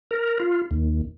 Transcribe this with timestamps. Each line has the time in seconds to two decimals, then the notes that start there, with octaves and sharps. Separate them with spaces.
0.11 A#4
0.40 F4
0.71 D#2